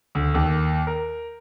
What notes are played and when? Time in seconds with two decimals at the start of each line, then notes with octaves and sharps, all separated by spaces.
0.15 D2
0.34 D#2
0.87 A#4